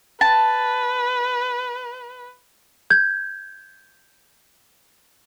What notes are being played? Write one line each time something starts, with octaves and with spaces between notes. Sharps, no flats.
B4 A5
G6 G#6